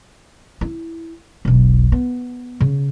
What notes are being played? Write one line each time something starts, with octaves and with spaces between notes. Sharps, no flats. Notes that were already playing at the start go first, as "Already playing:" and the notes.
E4
E1 B1
B3
C#3